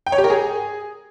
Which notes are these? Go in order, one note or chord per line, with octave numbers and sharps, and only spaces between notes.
G5
C#5
G4
A#4
G#4